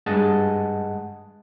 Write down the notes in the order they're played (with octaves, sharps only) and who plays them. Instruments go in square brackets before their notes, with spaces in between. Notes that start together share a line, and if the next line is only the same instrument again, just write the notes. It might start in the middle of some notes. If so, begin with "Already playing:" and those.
[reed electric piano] G2 G#3 D#5 F#5 A5